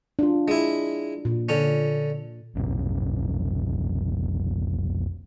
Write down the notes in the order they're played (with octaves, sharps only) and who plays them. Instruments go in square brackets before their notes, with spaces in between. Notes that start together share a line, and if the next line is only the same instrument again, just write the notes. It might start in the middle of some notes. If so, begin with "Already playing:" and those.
[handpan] D4 F4
[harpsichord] G#3 E4
[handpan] A#2
[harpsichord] D3 C#4
[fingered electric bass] F1 B1